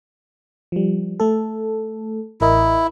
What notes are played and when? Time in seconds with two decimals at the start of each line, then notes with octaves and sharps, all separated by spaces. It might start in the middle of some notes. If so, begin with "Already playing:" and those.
0.72 F3 G3
1.20 A3 A4
2.41 A1 E4 A#4 D#5